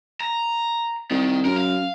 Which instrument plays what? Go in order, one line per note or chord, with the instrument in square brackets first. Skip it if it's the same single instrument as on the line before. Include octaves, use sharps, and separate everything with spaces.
[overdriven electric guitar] A#5
[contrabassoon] C2 [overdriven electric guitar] D#3
[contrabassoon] F#2 [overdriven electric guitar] A#4
[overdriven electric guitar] F5